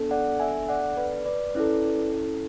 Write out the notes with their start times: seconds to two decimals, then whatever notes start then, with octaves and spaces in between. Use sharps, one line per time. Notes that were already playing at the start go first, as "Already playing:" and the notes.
Already playing: B3 D4 A4
0.11 D5 F#5
0.40 E5 G#5
0.69 D5 F#5
0.97 B4 D5
1.26 B4 D5
1.55 C#4 E4 A4